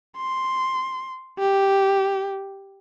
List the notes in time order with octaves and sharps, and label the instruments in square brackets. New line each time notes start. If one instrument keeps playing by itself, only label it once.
[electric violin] C6
G4